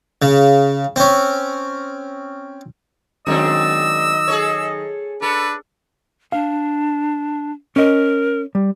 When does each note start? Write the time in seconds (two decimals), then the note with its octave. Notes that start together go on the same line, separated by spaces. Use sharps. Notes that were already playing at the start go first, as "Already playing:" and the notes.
0.22 C#3
0.96 C4 C#4
3.27 D#3 F#3 G#3 C4 D4 D#4 D#5 E6
4.28 G#4 A4 C#5
5.22 D4 A4 B4
6.32 D4 F5
7.76 C#4 A#4 D#5
8.55 G3